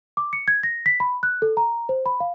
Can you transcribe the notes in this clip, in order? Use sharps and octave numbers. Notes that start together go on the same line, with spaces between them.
D6
C#7
G#6
A#6
B6
B5
F#6
A4
A#5
C5
B5
F5